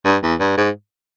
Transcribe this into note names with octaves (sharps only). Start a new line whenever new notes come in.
G2
E2
G2
G#2